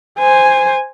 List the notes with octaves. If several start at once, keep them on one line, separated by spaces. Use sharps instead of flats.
C5 G#5